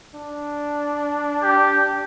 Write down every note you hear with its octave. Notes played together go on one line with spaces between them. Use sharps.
D4
G4